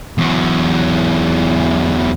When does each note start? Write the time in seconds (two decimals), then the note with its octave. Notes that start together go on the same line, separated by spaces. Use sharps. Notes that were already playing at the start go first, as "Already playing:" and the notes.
0.18 E2 F#3